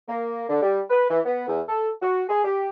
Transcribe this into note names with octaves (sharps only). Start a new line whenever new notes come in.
A#3
D3
G3
B4
E3
B3
E2
A4
F#4
G#4
G4